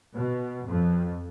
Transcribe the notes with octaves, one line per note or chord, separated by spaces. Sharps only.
B2
F2